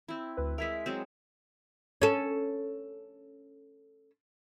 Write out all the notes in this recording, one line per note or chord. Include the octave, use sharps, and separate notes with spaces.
C4 E4
D2 B4
G#3 E4 A#4 E5 B6
F#3 G#3 C4
C#4 A4